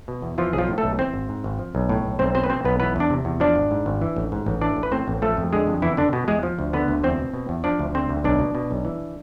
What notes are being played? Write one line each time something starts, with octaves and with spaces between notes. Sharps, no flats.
B2
E2
E3 F3 F4
B1 G#4
F3 F4
A2
A3 A4
B1
E3 C4 C5
G#1
G#2
G#1
F3
B1
A2
B1
B1 C4 C5
B2 C4 C5
B4
B2 C4 C5
B1 B3 B4
E3 B3 B4
E2 D4 D5
C3
E2
F3 D4 D5
G#1
G#2
G#1
E3
A1
G#2
A1
E3 D4 D5
A1
B4
A2 C4 C5
A1
F3 A3 A4
F2
D3 G#3 G#4
F2
E2 E3 E4
B2 D3 D4
B2 B3
E2 G#3 G#4
F3
D2
D3 B3 B4
D2
E2 C4 C5
B2
B2
E2
F3 D4 D5
D2
D3 C4 C5
D2
B1 D4 D5
B2
B2
B1
E3